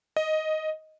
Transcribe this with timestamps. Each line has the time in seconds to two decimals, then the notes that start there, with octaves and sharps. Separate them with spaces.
0.16 D#5